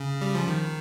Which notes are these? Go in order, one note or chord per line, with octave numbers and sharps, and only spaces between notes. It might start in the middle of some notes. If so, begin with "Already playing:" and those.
Already playing: C#3
G3
F3
D#3